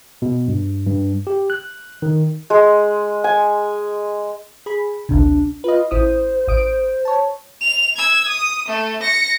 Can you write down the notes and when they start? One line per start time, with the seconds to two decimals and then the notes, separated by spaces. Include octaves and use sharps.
0.22 B2
0.48 G2
0.87 G2
1.27 G4
1.50 F#6
2.02 D#3
2.50 G#3
3.24 G#5
4.66 G#4 B5
5.09 A1 D2 C3 D4
5.64 F4 B4 D#5
5.91 A1 E4 C5 D#6
6.48 A1 D#6 D7
7.05 C#5 A5
7.61 F7
7.97 E6 G#6
8.28 D#6
8.68 A3
9.00 A#6 C#7